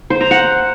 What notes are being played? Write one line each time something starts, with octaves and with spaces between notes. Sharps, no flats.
C5
A#5
F#5